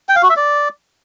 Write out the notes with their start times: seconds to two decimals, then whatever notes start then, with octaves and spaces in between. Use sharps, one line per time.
0.09 G5
0.16 F5
0.23 F#4
0.30 E5
0.36 D5